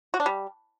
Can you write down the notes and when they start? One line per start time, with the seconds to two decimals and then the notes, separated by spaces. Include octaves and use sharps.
0.14 F#4
0.20 D4
0.26 G3